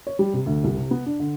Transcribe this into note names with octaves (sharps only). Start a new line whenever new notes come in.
C#5
G3
C3
D2
C2
C3
B3
D4
D3